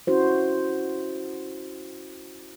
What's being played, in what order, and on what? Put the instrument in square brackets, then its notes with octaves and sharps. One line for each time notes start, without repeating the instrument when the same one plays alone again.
[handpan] C#4 E4 F#4 C5